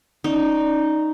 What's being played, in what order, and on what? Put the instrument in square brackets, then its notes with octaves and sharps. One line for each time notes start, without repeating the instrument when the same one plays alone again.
[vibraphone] C#4 D5 [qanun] D#4